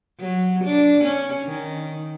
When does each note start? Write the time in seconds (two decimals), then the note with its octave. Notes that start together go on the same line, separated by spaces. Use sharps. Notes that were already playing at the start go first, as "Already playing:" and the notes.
0.20 F#3
0.64 D4
1.04 C#4
1.47 D#3